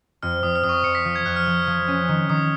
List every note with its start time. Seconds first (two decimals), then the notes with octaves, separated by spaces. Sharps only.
0.23 F2 F6
0.43 F2 D#6
0.55 F6
0.64 F2 D#6
0.69 C#6
0.74 D#6
0.84 F2 C#7
0.95 B6
1.05 F3
1.15 G#6
1.25 F2 F#6
1.36 F6
1.46 F3
1.67 F3
1.88 C#4
2.08 D#3
2.29 D#3 D#6